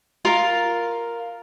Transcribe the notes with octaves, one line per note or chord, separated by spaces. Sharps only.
F4 A#4 F5